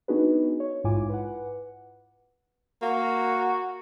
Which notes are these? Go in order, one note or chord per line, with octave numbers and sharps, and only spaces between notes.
B3 D4 D#4 F#4 G#4 B4
C#5
A#1 G#2 E4 F4 G#5 D6
B4 F#5
A#3 F#4